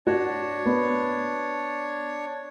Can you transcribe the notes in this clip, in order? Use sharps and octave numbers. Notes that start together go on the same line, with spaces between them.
D4 F#4 C#5
B3